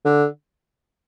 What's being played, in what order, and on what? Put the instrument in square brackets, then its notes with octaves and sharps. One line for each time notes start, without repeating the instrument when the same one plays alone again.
[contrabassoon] D3